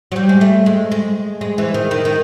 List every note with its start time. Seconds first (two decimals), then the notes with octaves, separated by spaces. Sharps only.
0.12 F#3
0.16 G3
0.29 G#3
0.41 A3
0.66 G#3
0.92 G#3
1.41 G#3
1.58 E3
1.74 D#3
1.91 D#3
2.05 D#3